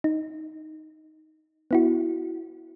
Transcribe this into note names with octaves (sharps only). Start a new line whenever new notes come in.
D#4
B3 E4 F#4